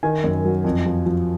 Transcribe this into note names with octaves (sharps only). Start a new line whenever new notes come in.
D#3 G#5
F#2
F#3
F2
F3
F3